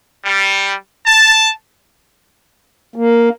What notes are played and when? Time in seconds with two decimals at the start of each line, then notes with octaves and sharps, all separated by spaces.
0.25 G3
1.06 A5
2.96 A#3